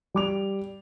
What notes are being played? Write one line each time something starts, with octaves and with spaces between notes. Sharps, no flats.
G3 D6 F7